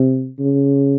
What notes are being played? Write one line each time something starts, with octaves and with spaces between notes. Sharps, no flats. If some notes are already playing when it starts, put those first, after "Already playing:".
Already playing: C3
C#3